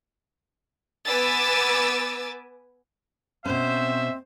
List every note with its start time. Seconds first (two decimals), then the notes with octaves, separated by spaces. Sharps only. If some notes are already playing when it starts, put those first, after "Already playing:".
1.05 B3 B4 G#5 D6 E6 A6
3.46 B2 C4 C#4 C5 E5